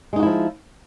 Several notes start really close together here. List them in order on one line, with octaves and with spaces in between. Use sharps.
G#3 D#4 F#4 E4 F3